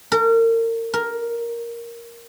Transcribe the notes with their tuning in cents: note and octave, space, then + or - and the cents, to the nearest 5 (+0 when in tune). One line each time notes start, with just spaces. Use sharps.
A#4 -35
A#4 +5